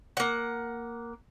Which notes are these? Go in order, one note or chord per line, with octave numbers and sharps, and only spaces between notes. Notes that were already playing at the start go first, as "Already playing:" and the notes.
A#3 F#5